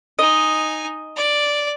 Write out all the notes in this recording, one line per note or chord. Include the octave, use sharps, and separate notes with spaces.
D#4 D#5 G#5
D5